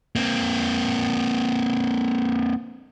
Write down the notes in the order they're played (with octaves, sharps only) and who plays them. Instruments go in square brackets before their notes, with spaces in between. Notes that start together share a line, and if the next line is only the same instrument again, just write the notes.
[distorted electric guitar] A#3 C4